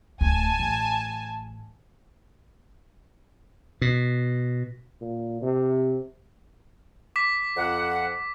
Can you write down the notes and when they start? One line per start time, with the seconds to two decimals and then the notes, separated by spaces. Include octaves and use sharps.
0.21 D1 A3 G#5 A5
0.59 A1
3.82 B2
5.01 A#2
5.42 C3
7.16 D6 B6
7.57 F2 F#5